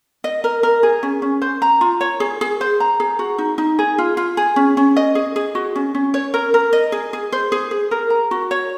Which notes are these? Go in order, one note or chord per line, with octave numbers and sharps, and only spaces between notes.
D#5
A#4
A#4
G#4
C#4
C#4
C5
A#5
F4
C#5
G#4
G#4
C5
A#5
G#4
F#4
D#4
D#4
G#4
F4
F4
G#4
C#4
C#4
D#5
G#4
G#4
F#4
C#4
C#4
C#5
A#4
A#4
D#5
G#4
G#4
C5
G#4
G#4
A#4
A#5
F#4
C#5